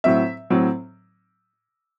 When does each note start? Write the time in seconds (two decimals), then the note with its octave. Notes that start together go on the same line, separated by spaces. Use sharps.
0.04 A2 F#3 C4 E5
0.50 A2 F#3 C4